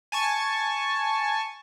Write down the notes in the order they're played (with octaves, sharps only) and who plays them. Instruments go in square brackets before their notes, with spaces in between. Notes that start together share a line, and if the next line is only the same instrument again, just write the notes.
[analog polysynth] G#5 A5 C#6